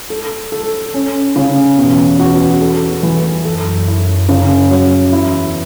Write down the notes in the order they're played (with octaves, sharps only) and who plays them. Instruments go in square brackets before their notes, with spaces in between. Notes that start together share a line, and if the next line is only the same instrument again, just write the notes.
[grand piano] A4
A4
C#4
C#3
[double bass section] E2 [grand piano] B2
[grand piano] F#4
A4
E3
[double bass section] F#2 [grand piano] A4
[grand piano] E4
C#3
F#3
[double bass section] E2 [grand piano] E4